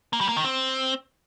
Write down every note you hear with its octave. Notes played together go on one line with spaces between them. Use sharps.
A#3
G3
A#3
D#3
C4